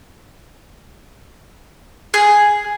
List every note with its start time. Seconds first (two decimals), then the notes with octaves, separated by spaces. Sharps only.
2.14 G#4